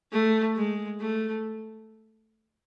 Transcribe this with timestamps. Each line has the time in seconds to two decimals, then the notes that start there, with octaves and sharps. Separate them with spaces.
0.12 A3
0.56 G#3
1.00 A3